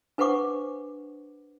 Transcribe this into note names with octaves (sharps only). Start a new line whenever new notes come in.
D4 B4 C5 F#5 C#6 D6